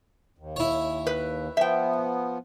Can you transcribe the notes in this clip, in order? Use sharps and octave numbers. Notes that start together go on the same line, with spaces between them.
D#2
E4 C#5
B4
F3 B3 E5 G5